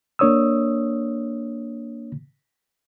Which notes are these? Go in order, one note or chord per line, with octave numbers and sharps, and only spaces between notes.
A#3 D4 C#5 D#6 E6